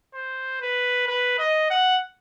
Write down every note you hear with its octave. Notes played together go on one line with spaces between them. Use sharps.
C5
B4
B4
D#5
F#5